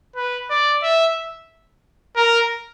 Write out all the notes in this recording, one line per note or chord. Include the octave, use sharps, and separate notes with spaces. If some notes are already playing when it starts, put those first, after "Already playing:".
B4
D5
E5
A#4